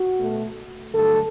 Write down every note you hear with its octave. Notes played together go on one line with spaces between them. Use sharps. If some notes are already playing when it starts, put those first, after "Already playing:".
Already playing: F#4
B2 A3
G2 D3 F#3 A3 A4